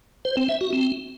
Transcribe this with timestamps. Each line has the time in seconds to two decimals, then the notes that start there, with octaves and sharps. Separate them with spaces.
0.25 C5
0.37 C4
0.49 E5
0.61 F#4
0.73 C4